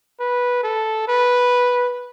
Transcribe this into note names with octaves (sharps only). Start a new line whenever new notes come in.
B4
A4
B4